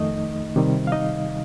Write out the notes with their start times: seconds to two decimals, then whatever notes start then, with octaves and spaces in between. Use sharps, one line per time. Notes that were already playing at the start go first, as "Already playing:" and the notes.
Already playing: F2 D#3 A3 D#4 D#5
0.56 C3 D#3 G3
0.87 F5
0.92 D#4 D#5